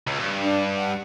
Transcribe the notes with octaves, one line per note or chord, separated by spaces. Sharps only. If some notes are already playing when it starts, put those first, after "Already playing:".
C#2
G2
D4
F#5